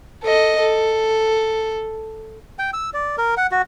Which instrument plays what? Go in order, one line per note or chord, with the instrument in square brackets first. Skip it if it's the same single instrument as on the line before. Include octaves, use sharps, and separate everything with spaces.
[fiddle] A4 D#5
A4
[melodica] G5
E6
D5
A#4
F#5
F#4